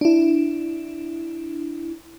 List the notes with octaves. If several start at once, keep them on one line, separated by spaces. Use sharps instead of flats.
D4 E4